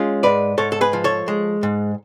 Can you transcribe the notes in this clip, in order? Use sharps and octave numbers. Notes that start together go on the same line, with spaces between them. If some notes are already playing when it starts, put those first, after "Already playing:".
Already playing: G#3 C#4 F4
G#2 B4 D5
G#2 A4 C#5
A4
G#4 B4
F3
A4 C#5
G#3
G#2